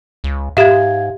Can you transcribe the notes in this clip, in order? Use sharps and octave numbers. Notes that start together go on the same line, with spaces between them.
C#2
G#2 G4 E5 F5 G#6